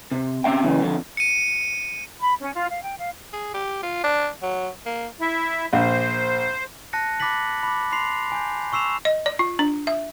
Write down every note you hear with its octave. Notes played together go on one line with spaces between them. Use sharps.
C3
C4 C#4 E5 G5
F#2 C#3 E3
F2 D3
C#7 D#7
B5
C#4
F4
F5
G5
F5
G#4
G4
F4
D4
F#3
A#3
E4 E5
A#1 C5
A5 F#6 A#6 C#7
B5 D6 F#6 A6 B6 F#7
B5 D6
C6 C7 F7
G#5 G6
C#6 E6 C7 E7 F7
D#5
D5
F4
D4
E5